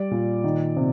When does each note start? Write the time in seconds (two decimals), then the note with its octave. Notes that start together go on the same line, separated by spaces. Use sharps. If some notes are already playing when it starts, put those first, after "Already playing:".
Already playing: G3 D5
0.11 A#2
0.44 D#3
0.77 C3